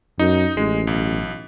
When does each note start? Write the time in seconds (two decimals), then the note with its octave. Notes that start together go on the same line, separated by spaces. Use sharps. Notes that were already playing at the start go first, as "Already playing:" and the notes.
0.19 F#2 D#4
0.57 A1 G#3
0.87 B1